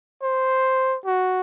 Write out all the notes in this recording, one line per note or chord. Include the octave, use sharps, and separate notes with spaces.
C5
F#4